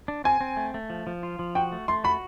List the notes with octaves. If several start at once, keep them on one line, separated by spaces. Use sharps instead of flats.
D4
C4 G#5
C4
A3
A3
F3
F3
F4
F3
F#4 G5
A3
A3 C6
F#4 B5